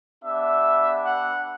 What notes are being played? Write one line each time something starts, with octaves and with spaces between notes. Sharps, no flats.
B3 D4 G4 E5
F#5